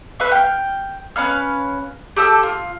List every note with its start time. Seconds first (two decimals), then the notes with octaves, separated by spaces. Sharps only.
0.20 B4 E5 F5 C#6
0.31 G5 F6
1.16 C#4 B4 F5 F6
2.17 G4 A4 D#6 E6
2.43 F4